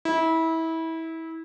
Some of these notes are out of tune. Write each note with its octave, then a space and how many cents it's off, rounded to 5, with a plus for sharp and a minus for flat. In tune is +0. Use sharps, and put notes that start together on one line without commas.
E4 -25